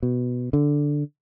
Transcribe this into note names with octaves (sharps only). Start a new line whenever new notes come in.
B2
D3